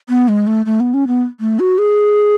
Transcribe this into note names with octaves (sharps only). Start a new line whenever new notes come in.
B3
G#3
A3
A3
B3
C#4
B3
A3
F#4
G#4